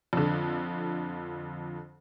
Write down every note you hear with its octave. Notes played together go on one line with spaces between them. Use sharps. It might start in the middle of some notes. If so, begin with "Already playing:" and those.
F2 D3